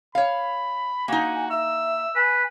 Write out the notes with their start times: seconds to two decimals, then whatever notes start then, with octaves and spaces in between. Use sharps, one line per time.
0.15 C#5 F5 B5
1.08 A#3 D#4 F#4 G#5
1.50 E5 E6
2.16 B4 G#5